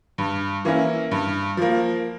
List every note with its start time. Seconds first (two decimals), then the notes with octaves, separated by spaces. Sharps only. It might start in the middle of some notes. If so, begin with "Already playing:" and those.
0.18 G2
0.65 E3 A#3 C#4 E4
1.11 G2
1.57 F3 A#3